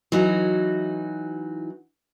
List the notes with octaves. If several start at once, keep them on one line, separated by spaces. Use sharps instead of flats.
E3 F#3 D#4 F#4